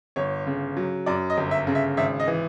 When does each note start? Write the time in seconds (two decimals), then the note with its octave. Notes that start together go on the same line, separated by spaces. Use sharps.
0.16 G1 C#5
0.47 C#3
0.77 F#3
1.06 F#2 D5
1.30 D#5
1.37 G1
1.51 E5
1.67 C#3
1.75 E5
1.97 G#1 E5
2.20 D#5
2.27 E3